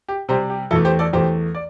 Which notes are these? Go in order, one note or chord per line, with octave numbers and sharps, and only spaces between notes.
G4
C3 G3 G4 C5
G4
E2 E3 A3 E4 A4
G4 C5
A4 D5
E2 E3 A3 G4 C5
D5